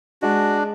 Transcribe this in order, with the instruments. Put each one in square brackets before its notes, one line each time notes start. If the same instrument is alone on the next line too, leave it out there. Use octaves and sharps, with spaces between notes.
[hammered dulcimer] G#3 [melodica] D4 F#4